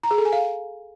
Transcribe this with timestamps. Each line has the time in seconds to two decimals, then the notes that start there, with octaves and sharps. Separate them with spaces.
0.03 A#5
0.11 G#4
0.18 A4
0.25 G#5
0.32 F5